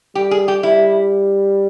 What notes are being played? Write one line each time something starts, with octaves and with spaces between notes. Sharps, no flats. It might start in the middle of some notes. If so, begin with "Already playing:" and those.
G3 G4
G#4
G4
G3 E4